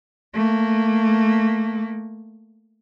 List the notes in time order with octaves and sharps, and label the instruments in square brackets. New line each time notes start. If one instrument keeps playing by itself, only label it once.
[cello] A3 A#3